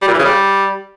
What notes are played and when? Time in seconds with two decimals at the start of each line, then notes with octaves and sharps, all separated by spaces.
0.02 G3
0.08 A#2
0.13 E3
0.19 C#3
0.25 G3